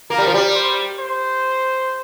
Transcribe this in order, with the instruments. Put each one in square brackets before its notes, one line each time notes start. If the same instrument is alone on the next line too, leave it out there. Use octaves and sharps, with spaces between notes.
[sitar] A#3 [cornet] A#4
[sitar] G3
F3
G3
[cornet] C5
C5